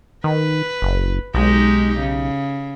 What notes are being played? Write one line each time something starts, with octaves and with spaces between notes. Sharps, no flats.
D#3 B4
F#1
B1 G#3 D#4 G4
C#3